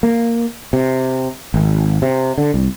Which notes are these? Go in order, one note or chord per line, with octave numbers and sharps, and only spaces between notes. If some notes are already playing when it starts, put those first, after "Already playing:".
A#3
C3
G#1
C3
D3
C2